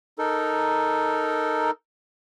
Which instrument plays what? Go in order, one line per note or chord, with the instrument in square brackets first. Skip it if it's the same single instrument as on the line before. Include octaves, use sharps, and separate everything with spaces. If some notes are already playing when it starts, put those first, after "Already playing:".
[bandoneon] D#4 A4 A#4